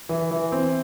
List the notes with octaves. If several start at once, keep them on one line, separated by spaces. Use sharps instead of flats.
E3
E3
C4